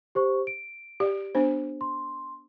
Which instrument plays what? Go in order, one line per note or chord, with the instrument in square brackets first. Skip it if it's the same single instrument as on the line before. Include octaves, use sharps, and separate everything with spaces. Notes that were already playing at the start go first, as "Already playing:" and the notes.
[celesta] G4 C5 C#6
D7
[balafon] G4 D5
B3 D4 C5
[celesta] C6